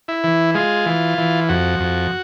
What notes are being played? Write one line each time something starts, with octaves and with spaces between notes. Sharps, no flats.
E4
E3
G#3 F4
E3
E3
F2 F#4
F2